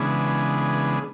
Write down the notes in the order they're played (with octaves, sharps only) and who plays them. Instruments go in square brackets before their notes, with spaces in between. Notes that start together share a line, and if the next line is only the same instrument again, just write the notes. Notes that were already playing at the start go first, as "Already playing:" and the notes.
Already playing: [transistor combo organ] C#3 E3 G#3 B3 D4